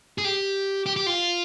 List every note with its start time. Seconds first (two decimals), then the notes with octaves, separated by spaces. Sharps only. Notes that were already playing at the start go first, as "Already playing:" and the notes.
0.18 G#4
0.25 G4
0.86 G4
0.96 G4
1.06 F4